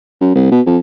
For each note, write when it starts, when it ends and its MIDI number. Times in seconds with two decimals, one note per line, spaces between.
0.21 0.34 42
0.35 0.47 36
0.51 0.61 47
0.66 0.78 41